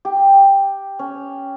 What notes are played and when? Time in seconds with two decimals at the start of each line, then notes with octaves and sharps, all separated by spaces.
0.05 G4
0.99 C#4